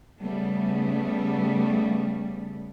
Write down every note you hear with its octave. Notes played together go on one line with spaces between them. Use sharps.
C#3 G3 A3 B3